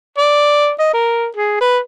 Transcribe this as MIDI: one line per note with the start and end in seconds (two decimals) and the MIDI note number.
0.17 0.71 74
0.79 0.93 75
0.93 1.27 70
1.36 1.60 68
1.61 1.79 71